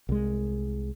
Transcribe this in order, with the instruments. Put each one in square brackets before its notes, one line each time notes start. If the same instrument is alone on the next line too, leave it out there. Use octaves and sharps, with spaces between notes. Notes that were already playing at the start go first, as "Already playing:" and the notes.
[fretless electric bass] C2 G#3